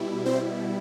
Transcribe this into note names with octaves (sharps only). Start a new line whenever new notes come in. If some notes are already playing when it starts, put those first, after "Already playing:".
Already playing: B2 G3 E4
C4 C5